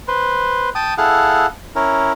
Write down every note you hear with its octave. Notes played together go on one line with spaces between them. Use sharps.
B4 C5
G5 A5 D#6
E4 G#4 A4 F5 F#5
C#4 E4 A#4